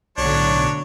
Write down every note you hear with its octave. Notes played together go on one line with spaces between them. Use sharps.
B1 A2 D3 F#3 D4 C#5